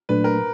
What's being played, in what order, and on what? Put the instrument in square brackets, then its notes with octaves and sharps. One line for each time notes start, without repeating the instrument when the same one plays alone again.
[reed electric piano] A#2 F#3 A3 D4 [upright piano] B4
[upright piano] A#4